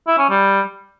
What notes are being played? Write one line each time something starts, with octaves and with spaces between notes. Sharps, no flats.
E4
C#4
G3